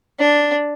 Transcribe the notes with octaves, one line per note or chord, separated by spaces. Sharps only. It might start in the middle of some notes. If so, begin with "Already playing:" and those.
D4